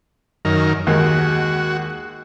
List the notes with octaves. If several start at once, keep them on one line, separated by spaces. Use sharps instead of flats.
F#2 D#3 A#4
D#2 G#3 A#3 F#4